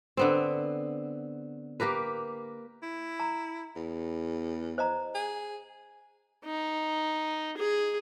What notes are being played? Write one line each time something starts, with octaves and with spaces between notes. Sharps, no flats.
D3 B3 C4
A#3 G4 A#4 B4
E4
A#5
E2
C5 D#5 A#5
G#4
D#4
G#4